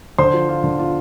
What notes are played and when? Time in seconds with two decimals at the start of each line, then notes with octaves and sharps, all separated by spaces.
0.18 D3 C5 C6
0.34 F3
0.49 F4
0.64 D3
0.79 F4